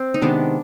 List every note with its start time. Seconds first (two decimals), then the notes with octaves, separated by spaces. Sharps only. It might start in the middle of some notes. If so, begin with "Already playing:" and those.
Already playing: C4
0.14 D#4
0.21 C3 D#3 G#3 B3 D4